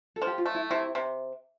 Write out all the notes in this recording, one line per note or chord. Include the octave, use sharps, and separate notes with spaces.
A4
F3
G4
F4
A3
E4
C3 E4
C3